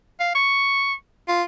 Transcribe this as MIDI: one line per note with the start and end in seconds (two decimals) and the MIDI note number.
0.20 0.32 77
0.35 0.92 85
1.28 1.43 65